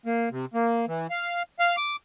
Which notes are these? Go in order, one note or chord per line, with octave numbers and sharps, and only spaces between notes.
A#3
C3
A#3
E3
F5
F5
D6